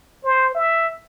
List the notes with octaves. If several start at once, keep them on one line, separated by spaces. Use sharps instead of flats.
C5
E5